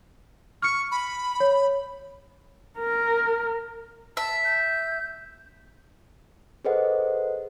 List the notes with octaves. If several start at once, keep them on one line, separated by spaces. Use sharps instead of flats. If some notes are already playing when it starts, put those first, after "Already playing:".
C#6 F6 C#7
B5
C#5
A#4
E5 A5
G6
G#4 A4 B4 C5 D#5 F#5